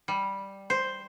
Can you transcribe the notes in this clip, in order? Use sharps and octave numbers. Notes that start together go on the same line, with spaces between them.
G3
C5